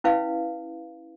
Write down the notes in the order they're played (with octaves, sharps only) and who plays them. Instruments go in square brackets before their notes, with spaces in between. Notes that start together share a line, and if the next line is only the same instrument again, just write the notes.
[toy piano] C#4 E4 B4 F5